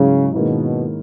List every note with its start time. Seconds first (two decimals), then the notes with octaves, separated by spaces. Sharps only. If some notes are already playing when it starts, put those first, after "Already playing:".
Already playing: G#2 C#3 F#3 C#4 E4
0.33 G#2 B2 D#3 A#3 C#4 E4